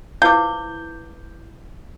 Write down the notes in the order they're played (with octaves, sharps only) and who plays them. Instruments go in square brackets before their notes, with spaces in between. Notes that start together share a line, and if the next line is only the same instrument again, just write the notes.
[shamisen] F3 [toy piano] E4 B4 D6 [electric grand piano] G6